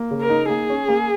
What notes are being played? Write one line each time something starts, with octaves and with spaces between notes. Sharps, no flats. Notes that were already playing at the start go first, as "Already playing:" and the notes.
Already playing: A#3
C#3
A#4
D#4
A#3 G#4
C#4
A#3